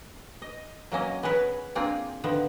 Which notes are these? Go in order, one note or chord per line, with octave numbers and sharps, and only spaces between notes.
D#5
F#3 A#3 C#4 D#5
B3 G#4 A#4 B4 C#5
A#3 C4 D4 F4 G#4
D3 D#3 F3 B3